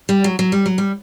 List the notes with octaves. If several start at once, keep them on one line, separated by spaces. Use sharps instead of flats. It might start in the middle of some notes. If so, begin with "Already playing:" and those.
G3
F#3
F#3
G3
F#3
G3